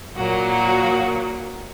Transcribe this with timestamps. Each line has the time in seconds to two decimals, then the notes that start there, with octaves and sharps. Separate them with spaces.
0.17 A#2 F#3 A#3 F#4
0.49 F#4